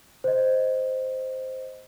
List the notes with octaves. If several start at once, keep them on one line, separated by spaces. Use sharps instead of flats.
C5 D#5